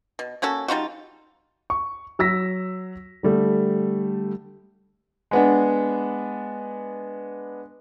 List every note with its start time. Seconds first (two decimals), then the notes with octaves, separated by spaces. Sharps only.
0.19 B2
0.42 A#3 C#4 F#4 A4
0.68 G3 D#4 F4 F#4
1.70 C#6
2.19 F#3 E6 A#6 B6
3.23 D3 G3 A3
5.31 G#3 B3 D4